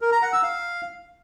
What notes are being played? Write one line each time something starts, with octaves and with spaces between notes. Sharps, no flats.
A#4
A#5
F#5
E6
F5